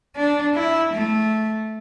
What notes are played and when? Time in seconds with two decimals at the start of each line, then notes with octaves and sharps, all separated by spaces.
0.16 D4
0.54 E4
0.93 A3